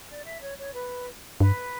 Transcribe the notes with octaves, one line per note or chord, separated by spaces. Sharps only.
D5
E5
C#5
C#5
B4
G2 B4